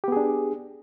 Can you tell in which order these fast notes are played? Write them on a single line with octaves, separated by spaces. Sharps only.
G4 B3 G#4 D4